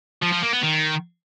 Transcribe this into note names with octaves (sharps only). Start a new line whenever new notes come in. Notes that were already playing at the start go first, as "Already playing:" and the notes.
F3
F3
A#3
B3
D#3